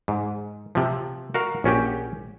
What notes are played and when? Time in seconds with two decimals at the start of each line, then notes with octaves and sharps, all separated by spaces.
0.08 G#2
0.75 C3 F3
1.34 F#4 A#4 F5
1.64 A#1 C#4 F#4 G4